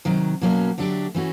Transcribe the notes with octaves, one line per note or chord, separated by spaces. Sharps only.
C3 D#3 F#3
B2 F#3 A#3 C#4
D3 F#3 A3 D4 G4
E3 A3 C#4 F#4